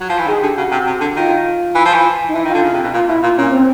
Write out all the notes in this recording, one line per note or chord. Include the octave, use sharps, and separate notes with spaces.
F#3
F3
E3
D#3 G#4
D3 G4
C#3 F#4
C3
C3
D3
D#3 F4
E3
F3
E3
D#4
E3 E4
D#3
F4
D3
C#3
C3
B2
A#2 F4
B2 E4
A#2 F4
A#2 C#4
C4